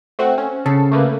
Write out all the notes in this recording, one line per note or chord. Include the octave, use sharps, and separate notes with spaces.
A3 C4 F#4
C#4
C#3 A4
A3 A#3 B4